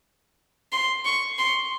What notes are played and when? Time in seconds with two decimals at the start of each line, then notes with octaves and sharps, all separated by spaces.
0.72 C6
1.05 C#6
1.39 C6